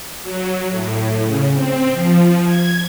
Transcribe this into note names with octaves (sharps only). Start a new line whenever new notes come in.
F#3
A2
C#3
C4
F3
G#6